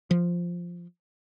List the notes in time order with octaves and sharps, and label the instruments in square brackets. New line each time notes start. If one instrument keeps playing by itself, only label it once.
[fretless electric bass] F3